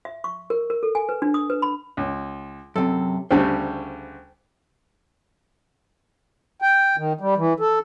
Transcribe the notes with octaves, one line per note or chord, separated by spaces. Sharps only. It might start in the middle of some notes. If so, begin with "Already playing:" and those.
E5
C#6
A#4
A#4
A4
G#5
B4
D4
D#6
B4
B5
C#2
F#2 C3 A4
D2 C#3 G3 C5 G5 A5
G5
D#3
G3
E3
A4